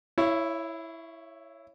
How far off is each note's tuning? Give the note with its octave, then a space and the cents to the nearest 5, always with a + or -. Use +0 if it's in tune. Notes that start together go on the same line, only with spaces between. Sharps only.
E4 +0 C#5 +0 F5 -45